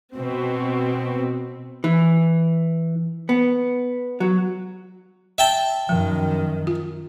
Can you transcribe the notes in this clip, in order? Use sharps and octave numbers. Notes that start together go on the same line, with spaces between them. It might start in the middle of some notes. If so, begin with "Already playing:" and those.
B2 C4
E3
B3
F#3
E5 G5 A5
F#2 D#3 F3
F4